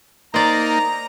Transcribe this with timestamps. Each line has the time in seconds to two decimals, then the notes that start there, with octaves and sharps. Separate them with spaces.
0.34 A#3 D#4 C5 D5 A#5